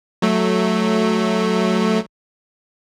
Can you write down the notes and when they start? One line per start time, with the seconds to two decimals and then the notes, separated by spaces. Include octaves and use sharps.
0.22 F#3 A3